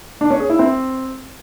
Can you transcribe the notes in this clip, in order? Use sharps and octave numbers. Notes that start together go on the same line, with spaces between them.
D4
C#4
G#4
E4
C4